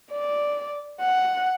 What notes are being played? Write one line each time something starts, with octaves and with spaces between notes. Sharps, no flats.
D5
F#5